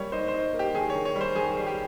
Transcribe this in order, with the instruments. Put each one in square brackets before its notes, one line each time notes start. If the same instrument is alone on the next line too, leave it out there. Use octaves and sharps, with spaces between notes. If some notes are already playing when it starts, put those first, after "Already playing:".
Already playing: [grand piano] G3 A#3 C#5
D#4 C5
C5
D#4
A#3
G4
D#3 G#4
D#3 C#5
C#5
G3
C5
D#3 G#4
G3
G4